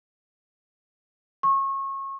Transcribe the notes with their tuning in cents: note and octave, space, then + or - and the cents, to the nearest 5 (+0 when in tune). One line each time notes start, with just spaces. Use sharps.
C#6 -30